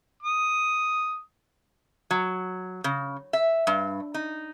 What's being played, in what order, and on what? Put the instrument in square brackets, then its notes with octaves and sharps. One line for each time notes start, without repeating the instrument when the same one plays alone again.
[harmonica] D#6
[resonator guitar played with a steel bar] F#3
C#3
E5
G2
D#4